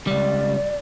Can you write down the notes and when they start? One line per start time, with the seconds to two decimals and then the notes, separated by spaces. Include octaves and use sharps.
0.07 C#2 G3 D5